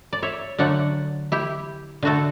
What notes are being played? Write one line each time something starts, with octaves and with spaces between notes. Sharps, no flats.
D5
C#5 E5
D3 F#3 A3 D5 F#5
E4 G4
D3 A3 F#4 A4